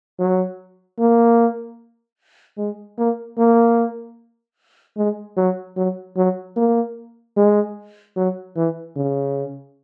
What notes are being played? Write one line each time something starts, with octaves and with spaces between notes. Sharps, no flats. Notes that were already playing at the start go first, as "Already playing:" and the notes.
F#3
A#3
G#3
A#3
A#3
G#3
F#3
F#3
F#3
A#3
G#3
F#3
E3
C#3